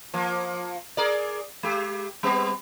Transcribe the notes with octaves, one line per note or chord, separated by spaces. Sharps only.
F3 A#3
G#4 A#4 D5
G#3 G4
G3 B3 C4